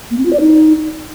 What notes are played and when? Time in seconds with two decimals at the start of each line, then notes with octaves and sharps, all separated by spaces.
0.11 A#3
0.18 C4
0.25 F4
0.33 D5
0.40 D#4